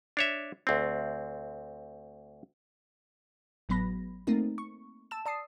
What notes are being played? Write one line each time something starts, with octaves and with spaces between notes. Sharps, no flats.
D4 C#5 E5
D2 C4
G#1 A2 F#3 B3 B5 A#6
A3 A#3 C4 D#4 A#4
C#6
A5 E6 E7
D5 A5 D#6 C7